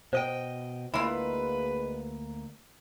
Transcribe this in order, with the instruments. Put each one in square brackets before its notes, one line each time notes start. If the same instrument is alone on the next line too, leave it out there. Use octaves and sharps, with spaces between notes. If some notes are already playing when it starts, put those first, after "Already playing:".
[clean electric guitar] B2 D#5 G5 [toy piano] C5
[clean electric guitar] D2 A#3 [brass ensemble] G#3 B4 [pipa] E4 F4